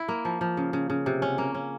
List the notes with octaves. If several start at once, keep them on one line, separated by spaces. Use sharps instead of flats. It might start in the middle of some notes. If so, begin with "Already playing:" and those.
Already playing: E4
A#3
F3
F3
C#3
C#3
C#3
C3
C#4
A#3
C#4